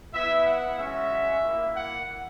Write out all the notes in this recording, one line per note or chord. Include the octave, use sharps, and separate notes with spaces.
B3 E4 E5
F#5
G#3 C#4 F#4 E5
A#3 E4
F#5